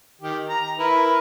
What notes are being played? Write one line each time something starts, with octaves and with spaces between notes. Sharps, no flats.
D#3 G4
A#5
E4 A#4 B4